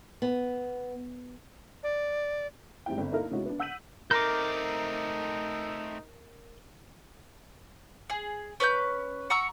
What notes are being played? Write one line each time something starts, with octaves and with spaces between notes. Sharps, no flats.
B3
D5
G#2 G3 C4 E4 G5
G1 C4
A#3 D#4 E4 A4 A#4 F5
C3 G#3 C#4 D#4 E4 F#4
B3 D4
F#5 E6 G6 B6 D#7 F#7
A3 C4 D#4 A#4 D6 G6
G#4
C#4 B4 C#6 G6
F#5 A#5 C#6 E6